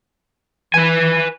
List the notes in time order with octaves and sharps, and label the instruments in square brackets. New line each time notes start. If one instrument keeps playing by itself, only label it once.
[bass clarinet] E3 [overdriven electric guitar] B4 G#5